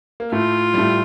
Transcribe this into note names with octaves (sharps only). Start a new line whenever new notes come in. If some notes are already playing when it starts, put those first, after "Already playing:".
A#3
A2 A3 F4
G3
A2 A3